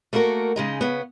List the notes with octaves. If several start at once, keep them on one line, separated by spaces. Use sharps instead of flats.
A3 A#3 E4 F#4 A#4
C#3 G#3 D#4
C#3 B3